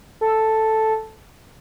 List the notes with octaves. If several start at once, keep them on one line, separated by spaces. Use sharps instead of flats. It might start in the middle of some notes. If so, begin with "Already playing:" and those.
A4